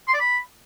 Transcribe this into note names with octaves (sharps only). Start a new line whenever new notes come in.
C6
D5
B5